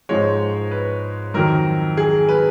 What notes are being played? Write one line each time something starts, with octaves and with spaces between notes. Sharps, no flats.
G#2 F3 G#3 C#5
B4
F2 D#3 F#3 A#4
G#4
B4